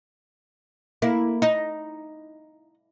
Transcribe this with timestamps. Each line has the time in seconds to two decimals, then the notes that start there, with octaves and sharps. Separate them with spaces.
1.02 A#3 E4
1.42 D#4